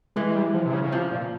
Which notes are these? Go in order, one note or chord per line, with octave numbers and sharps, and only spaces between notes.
E3 G#3
G#3
G3
F3
C3
C#3
C#3
C3 F3
A#2